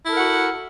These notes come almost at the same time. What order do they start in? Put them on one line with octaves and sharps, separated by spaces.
E4 A4 A#4 F#5 F#4